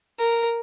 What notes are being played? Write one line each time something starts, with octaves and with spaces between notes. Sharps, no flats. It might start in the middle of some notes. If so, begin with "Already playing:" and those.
A#4